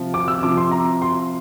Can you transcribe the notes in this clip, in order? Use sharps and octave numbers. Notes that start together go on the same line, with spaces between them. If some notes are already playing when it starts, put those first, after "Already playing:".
Already playing: C3 F3
D6
E6
C3 F3 D6
C6
A#5
C6